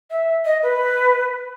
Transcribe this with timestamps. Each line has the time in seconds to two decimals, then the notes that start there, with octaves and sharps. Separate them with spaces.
0.10 E5
0.45 D#5
0.63 B4